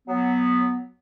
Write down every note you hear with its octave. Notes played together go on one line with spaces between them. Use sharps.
F#3 B3